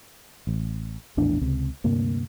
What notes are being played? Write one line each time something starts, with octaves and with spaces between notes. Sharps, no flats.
A1
A#1 E2 A2 D4
C#2 C3
D2 G2 C3 A#3